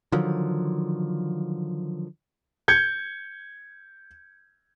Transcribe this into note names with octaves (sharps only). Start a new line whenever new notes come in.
D3 D#3 F3 F#3
G6 G#6 C#7